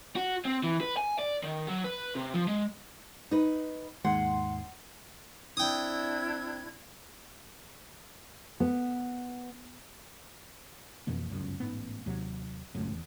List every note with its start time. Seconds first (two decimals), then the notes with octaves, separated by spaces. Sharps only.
0.16 F#4
0.45 C4
0.64 E3
0.81 B4
0.97 G#5
1.19 D5
1.44 D#3
1.68 F#3
1.84 B4
2.15 C3
2.35 F3
2.48 G#3
3.31 D#4 B4
4.05 D#2 G#2 F#5 C6
5.57 C4 D4 E4 G5 D#6 G#6
8.60 B3
11.07 F2 B2 E3 A#3
11.30 G1 C#2 F#2
11.60 A1 G#2 B3
12.06 D#2 C3 F#3
12.75 G#1 C#2 F#2 A2
12.92 E2